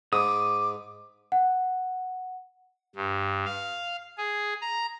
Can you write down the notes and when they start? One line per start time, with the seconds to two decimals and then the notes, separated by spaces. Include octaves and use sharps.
0.13 G#2 D6 D#6
1.32 F#5
2.95 G2
3.45 F5
4.18 G#4
4.62 A#5